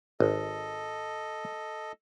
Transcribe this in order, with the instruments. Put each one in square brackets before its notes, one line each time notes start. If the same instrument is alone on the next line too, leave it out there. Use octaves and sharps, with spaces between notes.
[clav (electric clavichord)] G#1 [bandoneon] A4 D#5